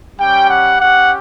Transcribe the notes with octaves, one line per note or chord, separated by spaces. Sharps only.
G3 C#4 G4 G5
F#5
C#4 G4 F#5